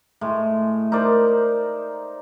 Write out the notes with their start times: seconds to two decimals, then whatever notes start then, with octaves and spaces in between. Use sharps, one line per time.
0.21 A2 G#3
0.92 D#4 A#4 C5 D5